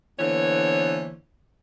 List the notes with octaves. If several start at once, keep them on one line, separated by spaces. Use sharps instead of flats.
D3 E3 A#3 B3 C5 C#5